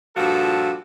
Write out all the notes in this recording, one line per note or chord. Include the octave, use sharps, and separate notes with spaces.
G2 A#2 F3 F#4 G4 A4